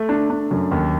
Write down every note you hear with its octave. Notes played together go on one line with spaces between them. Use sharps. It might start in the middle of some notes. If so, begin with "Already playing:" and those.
Already playing: A3
D4
D4
F#2
D#2